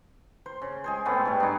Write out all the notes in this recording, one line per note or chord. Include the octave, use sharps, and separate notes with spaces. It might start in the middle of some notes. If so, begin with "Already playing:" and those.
C5
C#3
G#3 G#4 C5
A2 A3 B3 C4
G#2 G3
D4 D#4